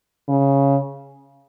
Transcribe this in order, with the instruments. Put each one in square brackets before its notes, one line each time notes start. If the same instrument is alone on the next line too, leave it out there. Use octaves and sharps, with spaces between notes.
[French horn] C#3